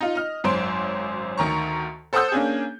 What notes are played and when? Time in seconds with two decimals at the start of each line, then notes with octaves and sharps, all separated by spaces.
0.01 D#4 F4
0.15 D#5 F6
0.44 G#1 F#2 C5 C6 D7
1.38 D2 D#3 A#5 C#6
2.13 A4 C5 F#5 D#6 E6 G6
2.32 A#3 C#4 D4 G#4